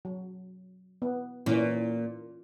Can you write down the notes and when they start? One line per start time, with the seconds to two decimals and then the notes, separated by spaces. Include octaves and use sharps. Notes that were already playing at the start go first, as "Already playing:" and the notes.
0.05 F#3
1.02 B3
1.46 A#2 E3 C#4